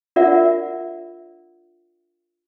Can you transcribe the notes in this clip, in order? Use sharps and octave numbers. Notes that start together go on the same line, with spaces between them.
D4 F4 A#4 D5 E5 F#5